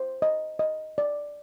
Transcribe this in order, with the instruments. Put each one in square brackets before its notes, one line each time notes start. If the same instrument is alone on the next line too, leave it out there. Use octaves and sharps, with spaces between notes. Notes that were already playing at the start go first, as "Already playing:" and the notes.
Already playing: [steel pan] C5
D#5
D#5
D5